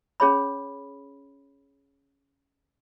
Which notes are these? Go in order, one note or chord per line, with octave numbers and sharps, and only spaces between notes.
C#4 G#4 C#5 B5